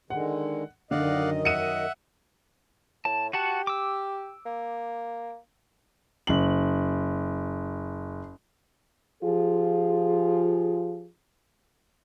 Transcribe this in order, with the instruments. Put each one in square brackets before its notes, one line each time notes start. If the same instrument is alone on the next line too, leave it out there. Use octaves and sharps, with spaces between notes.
[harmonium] D3 D#3 G#3 [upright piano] F#5
[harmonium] F#2 D#3 D#5 [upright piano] D3 [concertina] D5 F5 F#5
[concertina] E5 F#5 [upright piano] C#7 D#7
[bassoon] A2 [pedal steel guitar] A5
[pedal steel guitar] F#4 F#5 A5 [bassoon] G4
[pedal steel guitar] D6 E6
[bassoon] A#3
[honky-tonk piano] F#1 F#7
[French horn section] F3 F4 G4 G#4